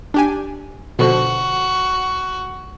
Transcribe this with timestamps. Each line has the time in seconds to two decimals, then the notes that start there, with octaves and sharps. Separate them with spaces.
0.14 D4 G4 G#5
0.99 B2 D3 F3 F#4